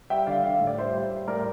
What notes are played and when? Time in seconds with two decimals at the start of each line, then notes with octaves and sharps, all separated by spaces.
0.10 G3 E5 G5
0.26 D3 D5 F5
0.44 D3 F5
0.55 A2 E5
0.67 D5
0.77 G3 C5 E5
0.94 G3
1.11 G3
1.28 A2 A#4 D5